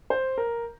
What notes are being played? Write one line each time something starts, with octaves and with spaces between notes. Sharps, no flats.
C5
A#4